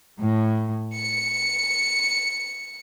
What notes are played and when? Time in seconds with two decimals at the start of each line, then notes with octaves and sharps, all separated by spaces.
0.20 A2
0.95 C#7